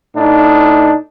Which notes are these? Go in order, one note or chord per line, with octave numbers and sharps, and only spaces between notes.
A2 D4 D#4